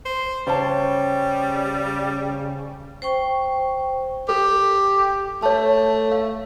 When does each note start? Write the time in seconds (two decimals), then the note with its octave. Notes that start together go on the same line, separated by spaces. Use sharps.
0.06 C5
0.47 C#3 G3 C5 C#5 A5
3.02 C5 G5 C#6
4.29 G4 A4
5.42 A3 C#5 A5
6.12 F5